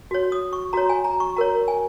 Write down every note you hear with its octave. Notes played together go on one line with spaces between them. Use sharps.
F#4 C#5
D#6
C#6
F#4 C#5 A#5
G#5
A#5
C#6
F#4 A#4 C#5 A#5
G#5